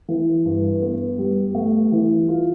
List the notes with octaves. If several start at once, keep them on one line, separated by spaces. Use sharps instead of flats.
E3
G2
B3
G3
A3
E3
F4